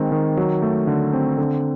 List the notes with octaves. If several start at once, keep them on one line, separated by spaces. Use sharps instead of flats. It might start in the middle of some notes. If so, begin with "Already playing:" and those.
Already playing: D#3 G#3 C4
D#3
F#3
A3
D3
C4
D3